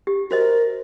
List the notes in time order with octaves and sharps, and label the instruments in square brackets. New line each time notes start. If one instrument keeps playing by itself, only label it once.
[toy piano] G4
[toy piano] F#4 C5 D#5 [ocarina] A#4